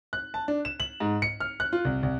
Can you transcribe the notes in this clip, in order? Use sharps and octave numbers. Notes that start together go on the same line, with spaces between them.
F#6
A5
D4
E7
F#7
G#2
C#7
F6
F#6
F4
C2
C2